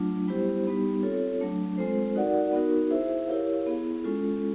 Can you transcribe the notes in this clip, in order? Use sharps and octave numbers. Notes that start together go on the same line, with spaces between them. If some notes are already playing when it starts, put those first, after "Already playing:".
Already playing: F#3 A3 D4 F4
G3 B3 E4 G4 C5
G3 B3 D#4 G4
C4 F4 A4 C#5
F#3 A3 D4
G#3 C4 F4 A4 C5
D#4 F#4 A#4 D5 F#5
B3 D#4 F#4 A#4
E4 G#4 C5 E5
E4 G4 A#4 C#5 F5
B3 E4 G#4
G#3 C#4 F4 A4